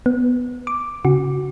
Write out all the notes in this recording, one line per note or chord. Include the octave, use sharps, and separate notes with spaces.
B3
D6
C#3 F#4